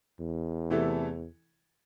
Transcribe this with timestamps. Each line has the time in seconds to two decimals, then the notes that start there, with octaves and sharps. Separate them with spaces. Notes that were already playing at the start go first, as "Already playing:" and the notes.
0.20 E2
0.70 C3 E3 A3 E4 A4